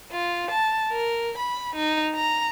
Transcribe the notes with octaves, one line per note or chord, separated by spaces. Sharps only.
F4
A5
A#4
B5
D#4
A#5